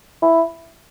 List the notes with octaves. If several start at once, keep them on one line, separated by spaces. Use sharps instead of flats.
E4